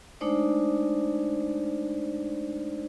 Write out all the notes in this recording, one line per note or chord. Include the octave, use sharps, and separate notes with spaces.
G#3 A3 D4 D#4 C5 D5